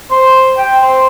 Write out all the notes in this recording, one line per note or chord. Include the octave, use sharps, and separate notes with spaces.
C5
G5
C5